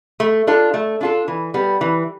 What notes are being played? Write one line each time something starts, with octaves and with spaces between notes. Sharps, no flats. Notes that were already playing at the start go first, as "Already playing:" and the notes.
A3
D4 F4 A4
A3
D4 F4 A4
E3
G3 B3
E3